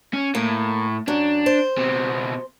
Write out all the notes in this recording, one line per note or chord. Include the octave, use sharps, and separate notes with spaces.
C#4
A2 A#3
F#2 D4
C5
B2 C4